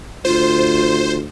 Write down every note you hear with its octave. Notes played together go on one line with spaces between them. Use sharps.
D2 F4 C5